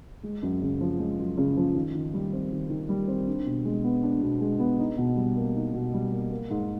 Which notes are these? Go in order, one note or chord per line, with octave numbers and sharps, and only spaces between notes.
G#3
F#2
C#3
F3
G#3
F#2
C#3
F3
D#3
D#3
G3
C4
D#3
D#3
G3
C4
D4
B2
G#3
B3
D4
B2
G#3
B3
D#4
B2
G3
A#3
D#4
B2
G3
A#3
A#3
G#2